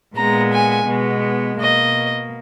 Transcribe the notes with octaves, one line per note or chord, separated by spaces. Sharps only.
A#2 G#3 B3 A#5
G#5
B2 G#3 B3
B2 A#3 D#5